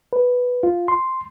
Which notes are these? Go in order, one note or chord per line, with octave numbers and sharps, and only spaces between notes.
B4
F4
C6